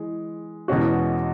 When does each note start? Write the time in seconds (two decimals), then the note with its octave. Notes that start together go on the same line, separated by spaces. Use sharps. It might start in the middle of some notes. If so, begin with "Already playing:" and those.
Already playing: E3 G#3
0.68 E2 B2 G#3 C#4 F#4